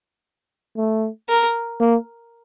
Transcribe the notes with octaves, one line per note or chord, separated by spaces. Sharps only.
A3
A#4
A#3